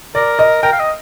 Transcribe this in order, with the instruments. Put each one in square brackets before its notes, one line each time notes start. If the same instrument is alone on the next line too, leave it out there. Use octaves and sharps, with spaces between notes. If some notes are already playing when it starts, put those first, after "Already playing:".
[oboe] A#4 [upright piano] D5
[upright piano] D#5
[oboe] A#4 [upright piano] G5
[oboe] F5
D#5